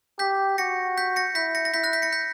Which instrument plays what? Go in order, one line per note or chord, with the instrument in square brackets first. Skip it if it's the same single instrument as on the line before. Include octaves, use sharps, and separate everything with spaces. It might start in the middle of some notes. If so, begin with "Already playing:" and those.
[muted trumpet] G4 [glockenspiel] G6 B6
[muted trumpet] F#4 [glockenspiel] A#6 C#7
[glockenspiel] G6 B6
A#6 C#7
[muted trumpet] E4 [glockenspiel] G6 B6
[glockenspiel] A#6 C#7
A#6
[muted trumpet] E4 [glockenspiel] G6 B6
[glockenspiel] F#6 A#6
G6 B6
A#6 C#7
G6 B6